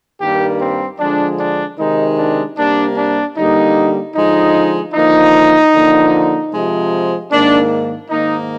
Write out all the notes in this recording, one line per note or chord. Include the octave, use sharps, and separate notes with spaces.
G2 D#3 G3 A#3 G4
C4
D3 F3 G#3 D4
D4
C3 D#3 G#3 D#4
D4
C3 G3 A#3 D4
D4
D3 G3 A#3 D#4
D3 F3 G#3 D#4
D3 F3 A#3 D#4
D3 F3 A#3
C3 F3 G#3
G#2 D#3 A#3 D4
G#2 D#3 A#3 D#4